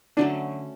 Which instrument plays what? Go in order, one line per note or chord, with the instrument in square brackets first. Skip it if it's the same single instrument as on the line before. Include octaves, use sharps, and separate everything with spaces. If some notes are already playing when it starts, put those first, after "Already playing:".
[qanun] D3 F#3 A3 C#4 [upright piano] D4